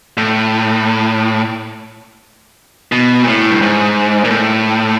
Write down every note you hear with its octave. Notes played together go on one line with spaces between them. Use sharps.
A2
B2
A#2
A2
G2
G#2
A#2
A2